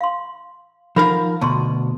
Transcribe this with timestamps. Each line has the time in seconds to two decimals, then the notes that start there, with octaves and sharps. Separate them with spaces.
0.01 F5 C6
0.96 F3 D#4 A#4 F5 F#5 B5
1.41 D2 B2 A5 C6